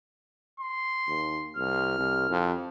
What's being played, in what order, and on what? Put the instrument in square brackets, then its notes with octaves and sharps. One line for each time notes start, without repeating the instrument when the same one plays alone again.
[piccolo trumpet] C6
[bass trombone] D#2
[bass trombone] C2 [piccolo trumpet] F6
[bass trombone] C2
F2